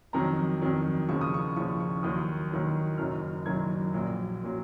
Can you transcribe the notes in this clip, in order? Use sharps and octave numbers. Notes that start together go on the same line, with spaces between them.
F2 D#3 F#3 A#5
F2 D#3 F#3
D#2 C#3 F3 C#6
D#6
C#6
D#2 C#3 F3 C#6
C#6
D#2 D#3 F#3 D#6
D#2 D#3 F#3
F#1 F#2 D#3 F#3 F6
F#1 F#2 D#3 F#3 G#6
A#1 A#2 F#3
A#2 F#3